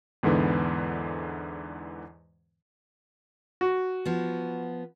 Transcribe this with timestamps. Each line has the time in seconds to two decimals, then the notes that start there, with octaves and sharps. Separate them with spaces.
0.23 E2 G#2 D3 E3 B3
3.61 F#4
4.05 F3 B3